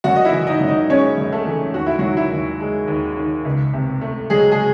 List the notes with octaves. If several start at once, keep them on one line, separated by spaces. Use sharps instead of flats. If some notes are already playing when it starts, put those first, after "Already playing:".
F#2 F#4 F#5
D#5
E4 E5
E3
D#4 D#5
F#2
D#4 D#5
G#3 C#4 C#5
F#2
A3 A4
E3
D#2 F#4
E4
D#3 F#3 F#4
E4
D#2
G#3
D#2
D#3
C#2
C3
A3
F#3 G#3 G#4
G#3 G#4